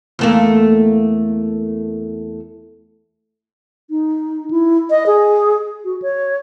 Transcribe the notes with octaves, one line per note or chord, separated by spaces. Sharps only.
E2 A3 A#3
D#4
E4
D#5
G#4
F#4
C#5